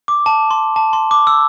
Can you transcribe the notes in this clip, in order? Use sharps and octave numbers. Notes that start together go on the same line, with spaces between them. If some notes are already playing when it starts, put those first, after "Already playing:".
D6
A5
C6
A5
C6
D6
E6